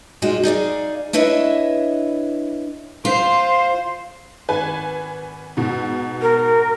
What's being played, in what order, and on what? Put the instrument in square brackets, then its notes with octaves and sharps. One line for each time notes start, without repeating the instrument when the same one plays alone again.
[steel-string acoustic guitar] A#2 G#3 D#4 F4 F#4
D#4 G#4 D5 F5
D4 E4 B4 C#5 D#5 E5
[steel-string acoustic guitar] F4 [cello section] C5
[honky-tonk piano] G#1 B4 G#5
G#2 B2
[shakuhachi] A#4